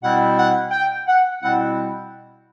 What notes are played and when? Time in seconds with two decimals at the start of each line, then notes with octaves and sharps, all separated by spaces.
0.02 B2 G3 C4 E4 F#5
0.36 F#5
0.71 G5
1.06 F#5
1.40 B2 G3 C4 E4 F#5